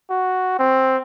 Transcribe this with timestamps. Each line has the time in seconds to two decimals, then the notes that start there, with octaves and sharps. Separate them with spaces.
0.10 F#4
0.59 C4